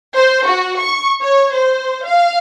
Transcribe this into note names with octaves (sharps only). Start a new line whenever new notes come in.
C5
F#4
C#6
C#5
C5
F5